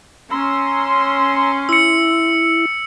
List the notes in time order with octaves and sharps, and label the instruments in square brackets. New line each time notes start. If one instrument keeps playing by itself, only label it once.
[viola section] C#4 C6 [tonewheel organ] A#5 E6
[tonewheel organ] E4 [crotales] E6 C#7